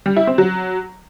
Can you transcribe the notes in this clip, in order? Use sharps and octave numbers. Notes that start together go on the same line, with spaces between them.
G3
E4
C4
F#3